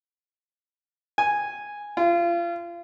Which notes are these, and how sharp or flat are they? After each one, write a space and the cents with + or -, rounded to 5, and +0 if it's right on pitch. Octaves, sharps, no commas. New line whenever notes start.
G#5 -5
F4 -30